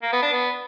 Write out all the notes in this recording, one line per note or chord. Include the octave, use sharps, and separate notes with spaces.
A#3
B3
D4
B3